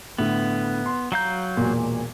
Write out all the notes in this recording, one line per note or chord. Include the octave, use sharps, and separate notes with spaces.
A2 D3 B3
C6
F#3 F5 A#5 G6
E1 A#2